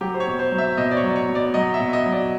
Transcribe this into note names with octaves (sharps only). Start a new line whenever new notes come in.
F#3 G4
C5
C#5
B2
C5
F#3
E5
B2 D#5
D5
C#5
F#3
D5
C#5
B2
D5
F#3 D#5
E5
B2
D#5
F#3
D5